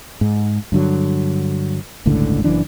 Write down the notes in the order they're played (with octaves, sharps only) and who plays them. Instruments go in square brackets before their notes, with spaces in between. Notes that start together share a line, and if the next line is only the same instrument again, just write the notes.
[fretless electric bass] G#2
G2 D3 F#3
G1 C#2 A2 D3
F#1 C#3 E3 D4